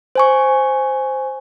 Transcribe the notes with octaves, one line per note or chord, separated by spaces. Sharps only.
C5 G#5 C#6